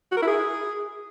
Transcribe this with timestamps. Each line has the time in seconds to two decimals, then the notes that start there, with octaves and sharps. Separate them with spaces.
0.11 F#4
0.17 A#4
0.22 E4
0.27 G#4